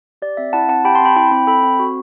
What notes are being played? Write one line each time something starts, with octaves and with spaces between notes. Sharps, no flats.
G4 D5
C4 E5
E4 F#5 A5
C4 F#5 A5
G4 G5 B5
A5 C6
C4 G5 B5
E4 G5 B5
C4
A4 G5 B5
C4
F#4